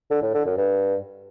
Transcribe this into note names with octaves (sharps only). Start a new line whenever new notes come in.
D3
A2
D3
F#2
G2